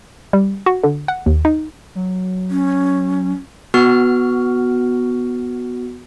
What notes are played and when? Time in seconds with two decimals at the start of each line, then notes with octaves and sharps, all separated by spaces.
0.33 G3
0.66 F#4
0.84 D3
1.08 F#5
1.26 D#2
1.45 D#4
1.95 F#3
2.51 C#4
3.74 B3 F#4 F6